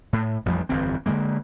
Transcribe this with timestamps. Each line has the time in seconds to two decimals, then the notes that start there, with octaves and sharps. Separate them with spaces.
0.13 A2
0.46 A1 F2 F3 G3
0.69 G1 F2 E3 C4
1.06 D3 F#3 G#3 A#3